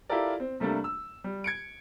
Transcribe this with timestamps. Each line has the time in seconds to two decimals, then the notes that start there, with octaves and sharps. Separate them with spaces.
0.09 E4 F4 G4 A4 A#4 D5
0.40 C4
0.60 C3 G3 A3 A#3 D4
0.84 E6
1.24 G3
1.44 G#6 C#7 D7